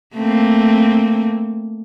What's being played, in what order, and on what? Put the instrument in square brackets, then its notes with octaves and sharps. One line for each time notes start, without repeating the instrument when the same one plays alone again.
[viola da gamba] A3 A#3 C4